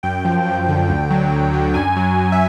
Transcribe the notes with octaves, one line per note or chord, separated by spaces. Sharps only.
F#2 G5
F3
F#2
D3
D2
F#3
D2
D3
F#2 G#5
F#3
F#2
E5